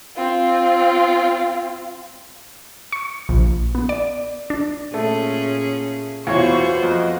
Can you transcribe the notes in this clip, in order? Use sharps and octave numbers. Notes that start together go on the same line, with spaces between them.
C4 F4
C#6
A#1
B3
D5
D4
A#2 A3 C#4 G#4
E2 B3 F4 F#4 C5 C#5 C#6
F2 D#5 F#5